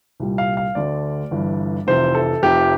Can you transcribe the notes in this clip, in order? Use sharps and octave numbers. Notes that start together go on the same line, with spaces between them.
C2 A#2 G3
F5
F5
D2 D3 A3 D5
G1 G2 E3
F1 F2 C3 E3 C5
A4
F1 F2 C3 G4